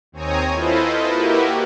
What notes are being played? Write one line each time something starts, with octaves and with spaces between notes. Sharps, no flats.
D#2 C4 C#5 G#5 A#5 D#6
E4 F4 A4 B4 C5 D#5
A#3 E4 F#4 G4 A#4 B4